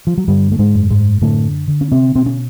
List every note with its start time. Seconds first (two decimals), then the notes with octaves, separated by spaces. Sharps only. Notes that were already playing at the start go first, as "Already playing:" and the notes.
0.07 F3
0.18 F#3
0.28 G2 D3 G3
0.52 A3
0.59 G#2 G#3
0.75 F#2
0.90 G#2 G#3
1.22 A2 D3 A3
1.68 D3
1.81 C#4
1.92 C3 C4
2.15 B2 C4
2.26 C#4